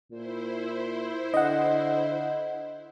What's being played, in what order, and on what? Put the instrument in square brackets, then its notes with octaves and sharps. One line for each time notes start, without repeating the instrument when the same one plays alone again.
[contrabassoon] A#2 [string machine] E4 C5
[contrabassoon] D3 [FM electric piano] D#5 F#5